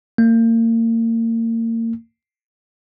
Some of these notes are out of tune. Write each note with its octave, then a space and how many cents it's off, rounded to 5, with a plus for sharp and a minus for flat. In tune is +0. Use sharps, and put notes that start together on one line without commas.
A#3 -35